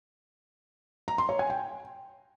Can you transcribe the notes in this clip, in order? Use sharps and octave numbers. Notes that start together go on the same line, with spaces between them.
A#5
C6
C#5
G#5
G5